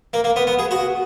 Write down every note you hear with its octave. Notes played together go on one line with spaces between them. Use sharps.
A#3
A#3
B3
B3
G#4
F#4